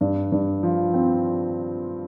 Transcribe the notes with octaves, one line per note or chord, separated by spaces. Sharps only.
G2
G2
F3
C4